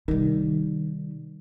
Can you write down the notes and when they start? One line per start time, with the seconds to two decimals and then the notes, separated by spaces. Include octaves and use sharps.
0.08 C3 D#3 G3